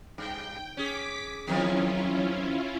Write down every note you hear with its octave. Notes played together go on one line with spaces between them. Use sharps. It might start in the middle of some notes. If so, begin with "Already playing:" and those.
G2 G5
C#4 G#4 D6 B6
E2 D#3 F3 F#3 C#4 E4 F4